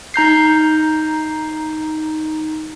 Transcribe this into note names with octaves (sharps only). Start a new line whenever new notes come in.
D#4 A#5 G6 C7